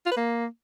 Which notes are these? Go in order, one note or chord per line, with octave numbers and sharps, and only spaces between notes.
F4
B4
A#3